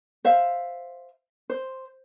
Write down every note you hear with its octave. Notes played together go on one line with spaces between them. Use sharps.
C5 E5 F5
C5